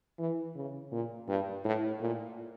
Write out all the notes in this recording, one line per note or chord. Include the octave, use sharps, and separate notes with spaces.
E3
C#3
A#2
G2
A2
A#2